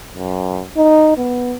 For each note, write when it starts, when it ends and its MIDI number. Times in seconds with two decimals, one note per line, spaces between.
0.15 0.64 42
0.77 1.16 63
1.17 1.57 59